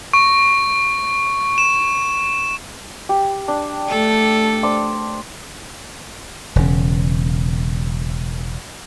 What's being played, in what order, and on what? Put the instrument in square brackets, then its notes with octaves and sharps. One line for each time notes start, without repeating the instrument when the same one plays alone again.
[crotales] C#6
E7
[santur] G4
D4
[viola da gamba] A3 A4
[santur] D4 C5 D6
[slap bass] E1 C#3